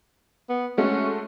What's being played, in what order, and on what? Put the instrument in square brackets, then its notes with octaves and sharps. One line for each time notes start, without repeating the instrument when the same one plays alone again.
[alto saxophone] B3
[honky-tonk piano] G#3 A3 F#4 [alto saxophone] C#4